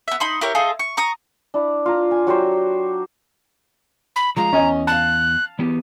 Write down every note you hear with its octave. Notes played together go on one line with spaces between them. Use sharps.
B3 E5
D#4 B5 C6
E4 G4 A#4 C#5
D#4 F4 G#4 A4
C#6
A#5 C#6 D#6
D4 E4
F4 A#5
G#5
F#3 F#4 G4 C5
B5
F3 G#3 F4 A#5
E2 C#4 D#5 G#5
F5 A5 F#6
E3 B3 G4